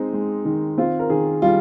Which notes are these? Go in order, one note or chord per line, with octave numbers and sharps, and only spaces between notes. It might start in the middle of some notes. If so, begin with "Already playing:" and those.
Already playing: G#3 C4 D#4
G#3
D#3
C4 F4
A#4
D#3 G#4
G3 F4